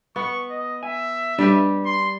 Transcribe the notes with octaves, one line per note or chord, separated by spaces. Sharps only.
B3 C#6
D#5
E5 G#5
G3 D4 G4 B4
C6